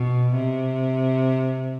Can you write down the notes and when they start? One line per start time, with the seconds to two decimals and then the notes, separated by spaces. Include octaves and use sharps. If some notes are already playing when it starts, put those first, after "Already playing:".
Already playing: B2
0.35 C3